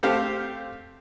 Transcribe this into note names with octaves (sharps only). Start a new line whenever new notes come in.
A3 C4 G4 C5 F5